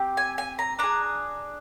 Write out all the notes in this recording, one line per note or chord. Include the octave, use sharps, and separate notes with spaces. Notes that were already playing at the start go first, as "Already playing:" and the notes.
Already playing: C4 G4
G#5
G#5
A#5
D4 G#4 A#5